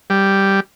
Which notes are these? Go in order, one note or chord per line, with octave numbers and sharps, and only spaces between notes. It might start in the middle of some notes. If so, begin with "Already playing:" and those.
G3